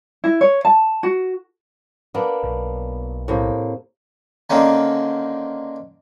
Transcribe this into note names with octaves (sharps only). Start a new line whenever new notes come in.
E4
C#5
A5
F#4
A#3 B3 D4
B1
A2 C3 A#3
D3 D#3 A#3 C4 C#4 D#4